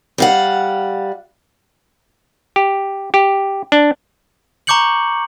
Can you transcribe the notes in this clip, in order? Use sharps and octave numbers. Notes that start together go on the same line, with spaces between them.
G3 F5 F#5
G4
G4
D4
A#5 C#6 D6 G6 C#7 F#7